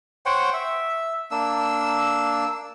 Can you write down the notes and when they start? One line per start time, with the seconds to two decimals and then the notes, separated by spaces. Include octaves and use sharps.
0.26 C5 C#5 F#5 G5
0.54 E5
1.31 A#3 D4 E6